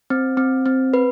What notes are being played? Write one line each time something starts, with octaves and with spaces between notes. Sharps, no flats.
C4
C4
C4
B4